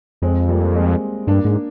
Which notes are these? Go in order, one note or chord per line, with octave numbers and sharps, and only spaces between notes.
F2 G#3 C4
G3 A#3
G#3 C4
G2 A#3 D4
G#2